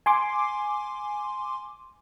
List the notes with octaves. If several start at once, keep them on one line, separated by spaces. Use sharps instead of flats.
G#5 C6 D6